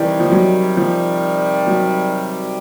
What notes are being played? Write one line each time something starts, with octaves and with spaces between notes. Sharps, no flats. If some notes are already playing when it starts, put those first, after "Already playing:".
Already playing: C3 D#3 E3 G3
F3
F#3
F3
F#3